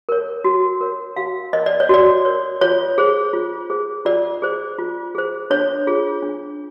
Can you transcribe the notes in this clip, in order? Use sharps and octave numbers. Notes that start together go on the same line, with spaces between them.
A#4 C#5
F#4
A#4 C#5
F#4 F5
A#4 C#5 D#5
D5
C#5
F#4 D5
A#4 C#5
F4 C#5
G#4 C5
F4
G#4 C5
F4 D5
G#4 C5
F4
G#4 C5
D4 C#5
F4 G#4
D4